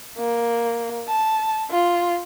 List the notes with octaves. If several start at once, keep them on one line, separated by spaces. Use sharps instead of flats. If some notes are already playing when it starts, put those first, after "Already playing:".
A#3
A5
F4